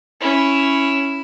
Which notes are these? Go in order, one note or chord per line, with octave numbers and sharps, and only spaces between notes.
C#4 E4 C#5